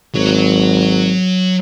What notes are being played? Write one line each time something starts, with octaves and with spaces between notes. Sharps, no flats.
G#1 F#3